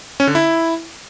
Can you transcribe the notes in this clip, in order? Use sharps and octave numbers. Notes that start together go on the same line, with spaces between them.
C#4
D3
E4